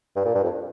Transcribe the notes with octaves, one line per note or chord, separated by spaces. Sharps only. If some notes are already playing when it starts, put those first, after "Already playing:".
G2
A#2
G2
F2